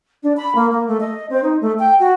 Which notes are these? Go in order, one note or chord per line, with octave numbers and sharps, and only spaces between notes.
D4
B5
A#3
A#3
A3
D#5
C4
D#4
A3
G5
F#4